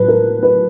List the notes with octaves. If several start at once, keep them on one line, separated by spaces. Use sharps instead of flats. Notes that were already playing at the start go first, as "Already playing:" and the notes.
Already playing: A2 F#3 B4
A#4
B4